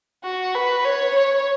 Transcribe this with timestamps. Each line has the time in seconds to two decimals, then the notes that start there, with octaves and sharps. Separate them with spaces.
0.24 F#4
0.55 B4
0.84 C#5
1.15 C#5